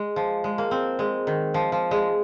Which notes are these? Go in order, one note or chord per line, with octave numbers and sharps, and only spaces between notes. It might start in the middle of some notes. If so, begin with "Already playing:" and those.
Already playing: G#3
F3
G#3
A#3
C4
G#3
D#3
F3
F3
G#3